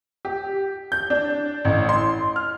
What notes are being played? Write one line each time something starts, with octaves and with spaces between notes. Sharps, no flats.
G4
G6
D4
A1
C6
F6